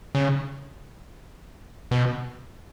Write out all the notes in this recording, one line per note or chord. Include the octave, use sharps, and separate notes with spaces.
C#3
B2